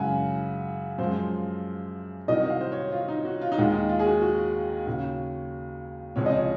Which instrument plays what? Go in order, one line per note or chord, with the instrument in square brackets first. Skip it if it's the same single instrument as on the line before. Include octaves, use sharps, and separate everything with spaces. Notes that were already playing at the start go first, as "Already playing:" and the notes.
Already playing: [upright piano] F#2 C#3 G#3 F#5 G#5
F#2 F3 G#3 C5
C2 C3 D#3 F#3 D#5
F5
C5
C#5
F4
D#4
F#4
F4
D#4
D#2 D#3 G#3 F4
D#4
F4
G#4
F#4
F#4
D#2 C#3 F#3
C#2 C3 F3 G#3 C#5
D#5
C#5